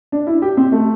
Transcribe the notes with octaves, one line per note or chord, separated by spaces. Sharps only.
D4
E4
G4
C4
A3